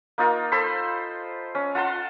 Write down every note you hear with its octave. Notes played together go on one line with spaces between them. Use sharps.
A#3 D#4 F4 A#4
A4 C5 B5 C6
C#4
F4 F#5 A5 C6